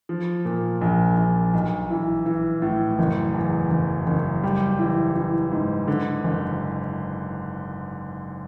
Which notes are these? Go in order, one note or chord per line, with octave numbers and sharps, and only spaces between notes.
F3
A#2
A#1
A#1
B1
E3
E3
A2
F#1
E2
F#1
F#1
G3
E3
E3
G#2
D3
F#1